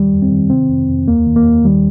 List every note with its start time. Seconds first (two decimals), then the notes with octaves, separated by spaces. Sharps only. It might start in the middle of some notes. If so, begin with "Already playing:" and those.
Already playing: D#2 D#3 G3
0.12 F2
0.22 C4
0.32 D#3
0.50 C3 C4
0.70 F2
0.88 F2
1.08 D#2 A#3
1.26 D#3
1.36 A#3
1.45 D#2
1.65 D#3 G3